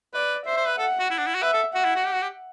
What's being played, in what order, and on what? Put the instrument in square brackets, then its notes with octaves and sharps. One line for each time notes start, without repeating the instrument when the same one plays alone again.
[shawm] B4 [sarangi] D5
[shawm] C5 [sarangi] E5
[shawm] C5
B4
[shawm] A4 [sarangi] F#5
[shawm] F#4
E4
D4
E4
F#4
[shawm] B4 [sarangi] E5
[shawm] A4
[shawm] F#4 [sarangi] F#5
[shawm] E4
F#4
G4
F#4
G4